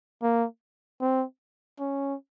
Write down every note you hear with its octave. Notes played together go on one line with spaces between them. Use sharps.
A#3
C4
C#4